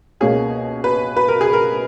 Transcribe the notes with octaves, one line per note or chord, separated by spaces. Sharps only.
C#2 B2 A#3 C#4 G#4
B4
B4
A#4
G#4
A#4